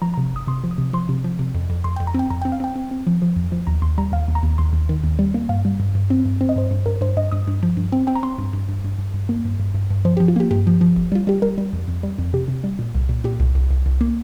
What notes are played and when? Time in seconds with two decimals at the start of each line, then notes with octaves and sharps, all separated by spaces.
0.02 F3 A#5
0.14 C3 A#5
0.33 G1 D#6
0.47 C3 C6
0.64 F3
0.71 D#6
0.78 C3
0.93 F3 C6
1.09 C3
1.24 F3
1.39 C3
1.55 F2
1.70 F2
1.84 F2 C6
1.96 F2 G5
2.07 A#5
2.14 C4 G5
2.30 F2 A#5
2.42 C4 G5
2.52 F5
2.60 C4 G5
2.76 C4
2.91 C4
3.07 F3
3.22 F3
3.36 F2
3.52 F3
3.67 D#2 A#5
3.82 D#2 C6
3.98 G3 A#5
4.12 D#2 F5
4.28 D#2
4.35 A#5
4.43 D#2
4.58 D#2 C6
4.73 D#2
4.89 D#3
5.04 D#2
5.19 G3
5.34 A#3
5.49 G2 F5
5.65 G3
5.80 G2
5.95 G2
6.10 C4
6.25 G2
6.41 C4 C5
6.49 D#5
6.56 G2 C5
6.71 G2
6.86 G2 A#4
7.01 G2 C5
7.17 G2 D#5
7.31 G2 D#6
7.47 G2
7.63 F3
7.77 G2
7.92 C4
8.07 C4 G5
8.16 A#5
8.23 C4 C6
8.38 G2
8.53 G2
8.69 G2
8.84 G2
8.98 G2
9.14 G2
9.29 A#3
9.45 G2
9.60 G2
9.74 G2
9.90 G2
10.05 F3 C5
10.17 F3 G4
10.28 F4
10.36 A#3 G4
10.51 G2 G4
10.67 F3
10.81 F3
10.96 G1
11.12 G3 F4
11.27 G3 G4
11.42 G3 A#4
11.58 G3
11.73 F2
11.88 F2
12.03 G3
12.18 F2
12.33 C3 G4
12.48 C3
12.64 G3
12.79 A#2
12.95 C2
13.09 A#2
13.24 A#2 G4
13.40 C2
13.55 C2
13.71 C2
13.86 C2
14.01 A#3